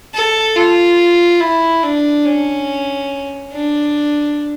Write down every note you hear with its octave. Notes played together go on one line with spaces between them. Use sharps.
A4
F4
E4
D4
C#4
D4